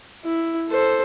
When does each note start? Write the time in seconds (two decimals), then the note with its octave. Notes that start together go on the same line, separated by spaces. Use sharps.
0.24 E4
0.70 A4 C5